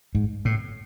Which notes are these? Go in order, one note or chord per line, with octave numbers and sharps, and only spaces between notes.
G#2
A2